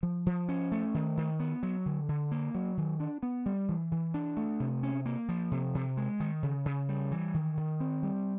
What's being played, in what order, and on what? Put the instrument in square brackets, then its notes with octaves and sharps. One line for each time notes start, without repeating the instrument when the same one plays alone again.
[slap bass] F3
F3
C#4
A3
D#3
D#3
B3
F#3
D3
D3
A#3
F#3
D#3
D4
B3
G3
E3
E3
D4
A3
C3
C#4
A#3
F3
C3
C3
G#3
D#3
C#3
C#3
G3
E3
D#3
D#3
C4
G3